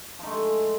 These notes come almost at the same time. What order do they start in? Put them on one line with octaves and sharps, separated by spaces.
F3 D#4 A3 G#3